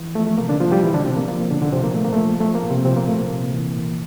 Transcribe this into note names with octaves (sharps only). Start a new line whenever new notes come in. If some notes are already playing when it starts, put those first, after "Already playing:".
Already playing: E3
F3 A3
A3
C3 A#3
D3 D4
F3 F4
G3 G4
A#2 E3 E4
D3 D4
C3 F3 C4
A#3
F3 A#3
A#2 D3 D4
D3 D4
C3 F3 C4
A#3
A#2 A3
A#3
A3
F3
F3 A3
A#3
A#2
C3 C4
C3 F3 C4
A#3
A#2 A3
A#3
C3
E3
A#2